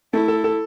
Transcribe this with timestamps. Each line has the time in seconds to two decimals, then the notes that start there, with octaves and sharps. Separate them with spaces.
0.13 A3 E4
0.28 A4
0.44 A4